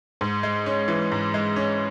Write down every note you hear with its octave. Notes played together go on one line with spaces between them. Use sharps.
G#2
G#3
C#4
E3
G#2
G#3
C#4